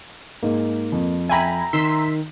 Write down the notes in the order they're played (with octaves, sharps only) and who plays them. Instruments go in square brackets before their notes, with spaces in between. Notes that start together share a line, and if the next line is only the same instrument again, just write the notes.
[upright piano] G#2 [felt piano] A#3
[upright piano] F2
[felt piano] E5 G5 A#5 [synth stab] G#5 B5
[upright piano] D#3 [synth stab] C6 E6 B6